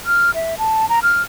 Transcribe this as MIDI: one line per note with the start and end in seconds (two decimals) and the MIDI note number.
0.06 0.31 89
0.35 0.55 76
0.58 0.88 81
0.89 0.99 82
1.03 1.22 89